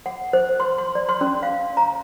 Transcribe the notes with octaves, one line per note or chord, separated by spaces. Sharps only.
F#5
C5
C6
C6
D5
C6
C#4
F5
A#5